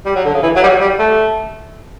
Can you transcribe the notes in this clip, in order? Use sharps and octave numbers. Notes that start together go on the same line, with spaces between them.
G3
F#3
D3
C#3
E3
F#3
G3
F#3
G3
A3